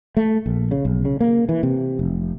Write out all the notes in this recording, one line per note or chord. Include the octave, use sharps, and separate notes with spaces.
A3
A#1
C#3
B1
C#3
A#3
E3
C3
F1